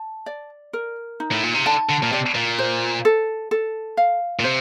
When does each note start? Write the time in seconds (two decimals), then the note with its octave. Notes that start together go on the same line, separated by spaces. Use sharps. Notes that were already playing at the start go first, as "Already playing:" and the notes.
Already playing: A5
0.26 D5
0.73 A#4
1.20 D#4
1.31 A2
1.43 A#2
1.54 C3
1.66 D3 A5
1.89 D3
2.03 A#2
2.12 C3 D5
2.35 A#2
2.59 C5
3.05 A4
3.51 A4
3.97 F5
4.39 A#2
4.44 C3 C5